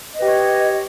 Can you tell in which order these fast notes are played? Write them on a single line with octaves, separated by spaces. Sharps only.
D#5 B4 G4 C#5